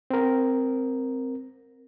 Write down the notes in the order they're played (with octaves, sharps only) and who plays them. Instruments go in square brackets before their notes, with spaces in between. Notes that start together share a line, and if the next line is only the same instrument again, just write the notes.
[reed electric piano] C4 A#4